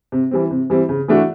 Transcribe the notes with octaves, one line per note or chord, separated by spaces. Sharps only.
C3
E3 G3 C4
C3
E3 G3 C4
C#3
E3 A3 D4 F#4